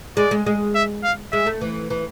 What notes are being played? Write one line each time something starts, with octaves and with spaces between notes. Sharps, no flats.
G#3 D5
G#3
G#3
E5
F5
G#3 E5
A3
E3
E3